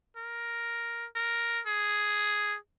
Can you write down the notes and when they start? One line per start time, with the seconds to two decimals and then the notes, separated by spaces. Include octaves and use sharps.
0.16 A#4
1.16 A#4
1.67 G#4